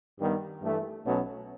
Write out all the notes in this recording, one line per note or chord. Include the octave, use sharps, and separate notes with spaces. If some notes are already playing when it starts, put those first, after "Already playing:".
G2 D#3 G3 B3
G2 E3 A3
B1 B2 F#3 A3 C#4